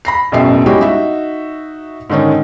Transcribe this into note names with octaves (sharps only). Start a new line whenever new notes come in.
B5 A#6 C7
E1 A1 F#2 B2 E5 C7
G3 G#3 C#4 E4 F#4 G4
D#4 F#4 E5
G#2 D3 D#3 C#4 D#4